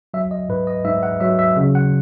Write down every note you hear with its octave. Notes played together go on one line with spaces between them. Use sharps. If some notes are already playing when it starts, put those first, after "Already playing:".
F#3 E5
D#5
G#2 B4
D#5
G#2 E5
F#5
F#3 E5
E5
C#3
F#5